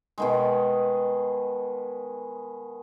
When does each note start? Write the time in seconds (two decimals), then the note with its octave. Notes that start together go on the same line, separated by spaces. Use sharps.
0.18 B2 D#3 G#3